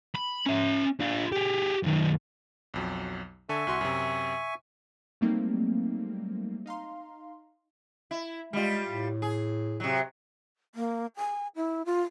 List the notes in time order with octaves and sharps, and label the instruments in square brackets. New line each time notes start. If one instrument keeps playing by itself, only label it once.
[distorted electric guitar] B5
C#4 E5
D4 F4
G4 G#4
F#2 D#3
[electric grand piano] B1 F2 F#3
[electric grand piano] D3 A4 [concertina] E5 G#5 C#6
[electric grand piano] C2 F#4 C6
F#2 C3
[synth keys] F#3 G3 A3 A#3 C4 D#4
D#4 F5 A#5 C6
[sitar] E4
[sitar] G3 F4 [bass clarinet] G#3
[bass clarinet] A2
[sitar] G#4
C3 F#3
[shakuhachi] A#3
G#5
E4
F4